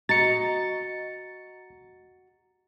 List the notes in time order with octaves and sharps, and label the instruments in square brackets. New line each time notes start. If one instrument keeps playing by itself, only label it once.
[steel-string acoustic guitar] F#4 D#5 A#5 [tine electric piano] A6 C#7